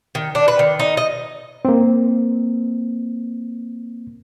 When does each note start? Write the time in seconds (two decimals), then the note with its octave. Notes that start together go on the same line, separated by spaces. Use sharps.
0.15 D#3
0.35 D4
0.48 B4
0.59 D#3
0.80 D#4
0.97 D#5
1.65 A#3 C4